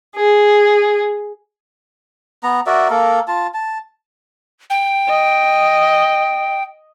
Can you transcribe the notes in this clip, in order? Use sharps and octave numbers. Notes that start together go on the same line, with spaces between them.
G#4
B3 A#5
F#4 A#4 D5 E5
A#3 A4 A#4
F4 A5
A5
G5
D#5